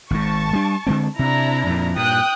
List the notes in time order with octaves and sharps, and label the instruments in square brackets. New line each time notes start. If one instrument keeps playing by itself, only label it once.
[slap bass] G#1 G#2 [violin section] A5 C#6
[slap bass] G3 D4
D3 G#3 C4
[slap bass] C3 [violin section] D4 E4 A#5
[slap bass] F2 A#2
[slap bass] G2 A#2 [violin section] G5 D#6 F#6